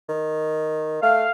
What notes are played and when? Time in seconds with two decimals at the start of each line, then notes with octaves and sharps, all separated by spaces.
0.09 D#3
1.03 A3 F5